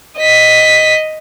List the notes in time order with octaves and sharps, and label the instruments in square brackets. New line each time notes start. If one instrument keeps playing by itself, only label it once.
[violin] D#5 B6